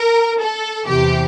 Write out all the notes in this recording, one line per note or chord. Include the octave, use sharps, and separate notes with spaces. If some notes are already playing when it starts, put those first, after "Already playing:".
Already playing: A#4
A4
E2 C3 E3 G4